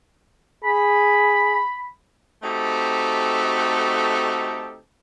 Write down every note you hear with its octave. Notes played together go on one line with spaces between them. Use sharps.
G#4 B5
A3 C4 D#4 F#4 G4 A4